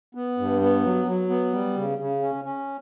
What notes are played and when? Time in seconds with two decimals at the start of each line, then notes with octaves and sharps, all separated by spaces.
0.15 B3
0.38 G2
0.61 B3
0.84 F#3
1.07 F#3
1.29 B3
1.53 G3
1.76 C#3
1.98 C#3
2.21 C#4
2.44 C#4